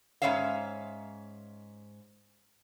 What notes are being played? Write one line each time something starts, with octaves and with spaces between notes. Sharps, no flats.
G#2 F3 C#4 C#5 E5 F5